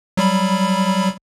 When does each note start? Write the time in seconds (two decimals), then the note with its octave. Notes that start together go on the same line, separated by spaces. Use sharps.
0.17 F#3 G3 B5